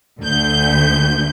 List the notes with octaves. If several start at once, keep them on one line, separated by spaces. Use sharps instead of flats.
D2 G6